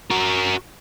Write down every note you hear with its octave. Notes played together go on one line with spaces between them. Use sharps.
F#4 A#4